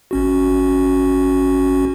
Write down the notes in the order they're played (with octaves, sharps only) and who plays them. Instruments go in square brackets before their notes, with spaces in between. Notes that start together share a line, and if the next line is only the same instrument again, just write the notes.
[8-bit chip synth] G#1 C#4 F#4